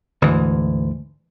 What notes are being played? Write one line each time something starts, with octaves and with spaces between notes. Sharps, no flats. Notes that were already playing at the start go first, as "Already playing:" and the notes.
D2 G#2 E3